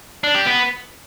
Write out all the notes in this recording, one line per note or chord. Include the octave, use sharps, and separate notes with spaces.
D4
G4
B3